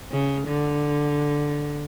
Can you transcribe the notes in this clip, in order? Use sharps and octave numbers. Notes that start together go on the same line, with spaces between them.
C#3
D3